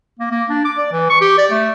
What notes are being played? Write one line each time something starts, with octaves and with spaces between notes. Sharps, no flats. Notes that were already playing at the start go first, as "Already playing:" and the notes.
A#3
A#3
D4
D6
D5
E3
C#6
G4
D5
A3